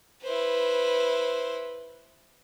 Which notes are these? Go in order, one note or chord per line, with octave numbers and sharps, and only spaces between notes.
E4 B4 C5